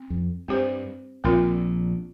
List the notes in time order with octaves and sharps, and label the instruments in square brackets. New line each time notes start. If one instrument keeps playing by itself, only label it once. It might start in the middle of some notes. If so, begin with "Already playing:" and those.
Already playing: [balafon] C4
[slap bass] F2
[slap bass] G2 [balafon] C4 G4 C5
[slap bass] A#1 A#2 [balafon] C4 F4 A#4